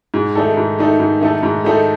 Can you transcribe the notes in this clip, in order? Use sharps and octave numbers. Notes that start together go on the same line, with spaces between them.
G#2
D#3 A3 D#4 A4
G#2
D#3 A3 D#4 A4
G#2
D#3 A3 D#4 A4
G#2
D#3 A3 D#4 A4